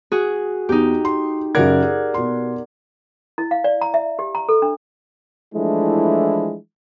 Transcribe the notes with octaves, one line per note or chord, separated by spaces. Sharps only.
F#4 G#4
E2 D#4 G4
C6
F#2 C#3 A#4 D5 F#5 G#6
G#4
B2 C6
E4
F5
D5
A#5
E5
G4
A#5
A4
D4
E3 F3 G#3 A3 D4 E4